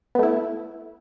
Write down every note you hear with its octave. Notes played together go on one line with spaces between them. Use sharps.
A3 B3 E4